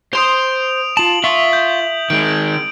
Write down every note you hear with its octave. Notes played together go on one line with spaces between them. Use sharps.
C5 C6 D#6 D7 F7
F4 A5 F#7
F4 E5 C#6
G6
D#3 G#3 D7